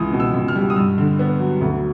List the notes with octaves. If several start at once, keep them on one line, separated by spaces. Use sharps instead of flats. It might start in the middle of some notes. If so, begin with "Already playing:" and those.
Already playing: C#2 E3 D#6
B2
E6
C#2
F6
G3
D#6
G2 E6
D3
B3
F#3
D2